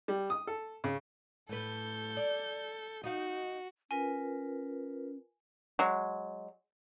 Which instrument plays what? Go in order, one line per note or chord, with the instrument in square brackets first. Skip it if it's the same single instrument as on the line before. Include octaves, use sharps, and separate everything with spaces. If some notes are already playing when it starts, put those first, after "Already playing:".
[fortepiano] G3
D#6
A4
C#3
[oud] A2 B4 [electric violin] A4 G6
[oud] D5
[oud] D#4 F5 [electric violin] F#4
[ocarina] C#4 [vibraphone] F4 A#4 B4 [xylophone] G#5
[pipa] F#3 G#3